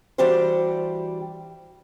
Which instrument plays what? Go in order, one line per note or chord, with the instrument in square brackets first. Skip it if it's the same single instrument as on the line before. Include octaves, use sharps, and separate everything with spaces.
[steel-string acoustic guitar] E3 G3 D4 F#4 G4 C5